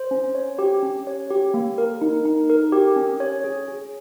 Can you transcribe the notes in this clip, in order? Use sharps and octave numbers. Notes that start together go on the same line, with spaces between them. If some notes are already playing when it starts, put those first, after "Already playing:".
Already playing: C5
C#4
C#5
G4
C#4
C#5
G4
A#3
A#4
D#4
D#4
A#4
G4
C#4
C#5
G#4
G#4